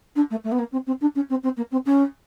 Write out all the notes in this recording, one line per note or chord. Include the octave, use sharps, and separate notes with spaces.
D4
A3
A3
B3
A#3
C4
C4
D4
C#4
C4
C4
A#3
C4
C#4